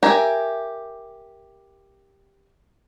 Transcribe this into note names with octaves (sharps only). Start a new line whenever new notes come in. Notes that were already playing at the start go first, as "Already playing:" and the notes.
G4 A#4 E5 G#5 A#5